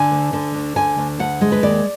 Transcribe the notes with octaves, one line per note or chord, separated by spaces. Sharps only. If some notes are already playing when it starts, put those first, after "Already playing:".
Already playing: D3 G#5
D2
D3
D2
D3 G#5
D2
D2 F#5
G#3
B4
D#2 D5